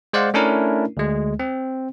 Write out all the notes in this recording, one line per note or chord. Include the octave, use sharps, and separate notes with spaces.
G#3 C5 D5 F5 F#5
A3 C#4 D4 E4 A#4
D2 G#3
C4